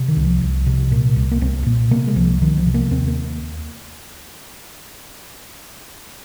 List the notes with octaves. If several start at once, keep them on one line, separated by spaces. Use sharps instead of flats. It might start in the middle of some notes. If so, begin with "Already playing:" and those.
Already playing: C3
D#3
C2
F3
C2
C3
A#2 A#3
C2
A#3
C2 C4
A#2
C3 A#3
G#3
C2 F3
C2 D#3
F3
C3
A#3
D#2 C4
A#3